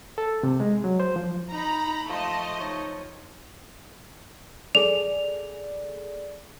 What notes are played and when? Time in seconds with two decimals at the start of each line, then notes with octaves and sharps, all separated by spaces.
0.18 A4
0.43 C3
0.60 G#3
0.84 F#3
1.00 C5
1.16 F3
1.51 D#4 A#5 B5
2.09 F3 A3 D#5 A5 C6
2.59 D#4 C#5
4.75 G#4 A4 D5 F7